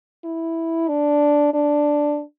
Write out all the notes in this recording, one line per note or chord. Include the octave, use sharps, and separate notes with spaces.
E4
D4
D4